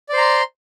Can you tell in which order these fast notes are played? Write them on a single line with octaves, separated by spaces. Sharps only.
D5 C5 A#5 C6